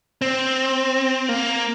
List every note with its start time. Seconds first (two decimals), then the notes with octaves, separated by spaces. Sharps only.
0.22 C4
1.29 A#3